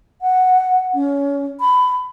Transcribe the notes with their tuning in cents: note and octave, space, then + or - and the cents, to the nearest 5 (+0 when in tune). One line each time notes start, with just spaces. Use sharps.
F#5 +0
C#4 +25
B5 +20